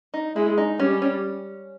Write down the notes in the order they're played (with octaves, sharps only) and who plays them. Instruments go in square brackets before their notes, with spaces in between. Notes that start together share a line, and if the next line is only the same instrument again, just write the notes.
[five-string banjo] D#4
[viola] G#3 [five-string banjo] E4
[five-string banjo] D#4
[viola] G3 [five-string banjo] C#4
[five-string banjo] C#4